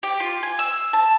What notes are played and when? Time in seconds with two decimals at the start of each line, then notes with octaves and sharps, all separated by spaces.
0.03 G4
0.20 F4
0.43 G#5
0.59 E6
0.93 A5